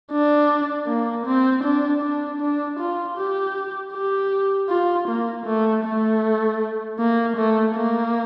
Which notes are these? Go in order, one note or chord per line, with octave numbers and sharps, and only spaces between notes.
D4
A#3
C4
D4
D4
D4
F4
G4
G4
F4
A#3
A3
A3
A#3
A3
A#3